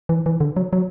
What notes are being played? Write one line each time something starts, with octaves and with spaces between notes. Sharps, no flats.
E3
E3
D3
F#3
F#3